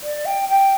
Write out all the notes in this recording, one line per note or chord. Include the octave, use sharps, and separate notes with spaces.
D5
G5
G5